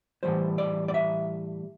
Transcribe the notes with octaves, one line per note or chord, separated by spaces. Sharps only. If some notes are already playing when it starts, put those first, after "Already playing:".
A2 E3 G3 C5
D5
D5
E5